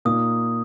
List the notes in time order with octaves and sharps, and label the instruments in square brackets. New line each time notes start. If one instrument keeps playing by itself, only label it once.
[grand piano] A#2 A#3 D#4 [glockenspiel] D#6